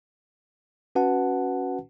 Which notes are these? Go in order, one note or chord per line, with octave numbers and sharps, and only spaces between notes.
C#4 F#4 B4 F#5 A5